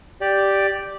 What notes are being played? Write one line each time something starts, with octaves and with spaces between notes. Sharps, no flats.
G4 D5